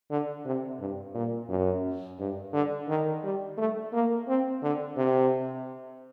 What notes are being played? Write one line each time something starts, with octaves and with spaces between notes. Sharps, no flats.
D3
C3
G2
A#2
F#2
G2
D3
D#3
G3
A3
A#3
C4
D3
C3